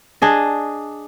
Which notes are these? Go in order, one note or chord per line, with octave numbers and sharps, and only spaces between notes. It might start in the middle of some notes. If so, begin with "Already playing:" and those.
D4 G#4 D#5